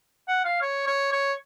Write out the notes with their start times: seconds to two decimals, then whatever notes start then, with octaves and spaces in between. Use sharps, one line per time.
0.28 F#5
0.45 F5
0.62 C#5
0.87 C#5
1.12 C#5